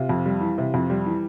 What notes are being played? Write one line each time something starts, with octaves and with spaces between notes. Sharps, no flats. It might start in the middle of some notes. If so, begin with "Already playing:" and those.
Already playing: C3 F4
F2
G3
E3
C3
F2
G3
E3